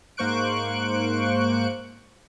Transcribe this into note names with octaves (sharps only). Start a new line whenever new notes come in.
G#2 A#3 C5 C#6 F#6 D7